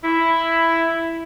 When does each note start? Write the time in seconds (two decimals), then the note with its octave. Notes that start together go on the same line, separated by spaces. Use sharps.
0.04 E4